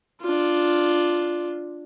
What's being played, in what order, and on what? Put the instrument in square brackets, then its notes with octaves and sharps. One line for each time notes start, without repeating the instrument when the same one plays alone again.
[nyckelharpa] D4 F4